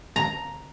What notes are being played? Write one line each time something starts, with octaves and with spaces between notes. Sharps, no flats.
A#5